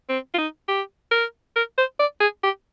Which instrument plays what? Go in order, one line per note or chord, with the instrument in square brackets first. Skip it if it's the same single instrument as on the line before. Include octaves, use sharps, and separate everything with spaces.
[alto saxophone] C4
F4
D#4
G4
A#4
A#4
C5
D5
G#4
G4